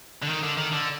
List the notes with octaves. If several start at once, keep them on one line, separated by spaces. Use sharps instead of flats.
D3
D#3
D3
D#3
D3